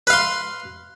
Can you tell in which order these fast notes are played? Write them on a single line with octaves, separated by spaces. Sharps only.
B4 F5 C6